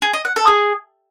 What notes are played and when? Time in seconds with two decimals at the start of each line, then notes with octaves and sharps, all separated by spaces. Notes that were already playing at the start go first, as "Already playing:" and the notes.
0.02 G#4
0.13 D#5
0.25 F#5
0.36 A4
0.48 G#4